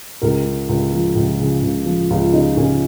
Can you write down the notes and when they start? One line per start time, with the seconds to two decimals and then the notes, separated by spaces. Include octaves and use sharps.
0.22 C#2 A#4
0.45 C#3
0.69 C#2
0.93 F3
1.16 C#2
1.40 C#3
1.62 C#2
1.86 F3
2.10 C#2 F4
2.33 C#3 D#4
2.56 C#2 C#4